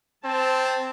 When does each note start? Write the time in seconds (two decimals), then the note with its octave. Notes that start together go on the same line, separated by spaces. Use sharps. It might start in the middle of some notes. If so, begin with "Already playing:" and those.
0.25 C4 C5 A5